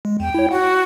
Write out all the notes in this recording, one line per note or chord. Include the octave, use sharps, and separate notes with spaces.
G#3
E2 G5
E4 C#5
F#4 F#5